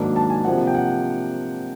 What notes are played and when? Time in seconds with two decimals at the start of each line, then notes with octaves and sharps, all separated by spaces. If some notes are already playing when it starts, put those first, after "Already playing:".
Already playing: G#2 D#3 F#3 A#3 D4
0.16 A5
0.30 G#5
0.45 C3 F3 A#3 D4 F#5
0.67 G5
0.75 F#5